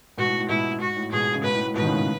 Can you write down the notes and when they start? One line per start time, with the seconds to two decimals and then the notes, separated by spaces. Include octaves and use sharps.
0.18 G#2 B2 F#4
0.28 A2
0.39 A2
0.49 G#2 B2 E4
0.81 G#2 F#4
0.97 A2
1.12 G#2 B2 G#4
1.35 C#3
1.44 G#2 B2 B4
1.55 A2
1.65 A2
1.76 G#2 B2 B4
1.81 D#3
1.86 A2 C#3
1.96 A2 C#3